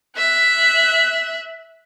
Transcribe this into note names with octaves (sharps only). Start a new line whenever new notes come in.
E5 F#6